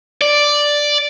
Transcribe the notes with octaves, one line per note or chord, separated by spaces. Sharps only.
D5